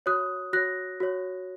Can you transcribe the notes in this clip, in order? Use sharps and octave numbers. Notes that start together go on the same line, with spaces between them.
F#4 C#5 D#6 F#6
F#4 C#5 F#6 A#6
F#4 C#5